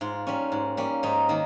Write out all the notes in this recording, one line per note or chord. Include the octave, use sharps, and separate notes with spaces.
G#2 F4
G3 A#3 C#4
G#2
G3 A#3 C#4
G#2 D#4
D#3 A#3